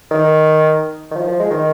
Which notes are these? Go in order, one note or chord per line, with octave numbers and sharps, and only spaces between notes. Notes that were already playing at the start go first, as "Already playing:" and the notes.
D#3
D#3
F3
F3
G#3
D#3